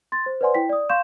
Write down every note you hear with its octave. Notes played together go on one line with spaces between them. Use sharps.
C6 A6
C5
B4 C5 D5 F#5 G#5 C6
E4 G5 B6
D5 D#6
F5 C6 C#6 G6 E7